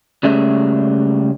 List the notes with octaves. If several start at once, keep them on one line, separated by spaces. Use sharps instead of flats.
C#2 G3 A3 C#4 G#4 E5